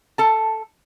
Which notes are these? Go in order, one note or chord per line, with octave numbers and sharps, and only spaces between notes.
A4 A5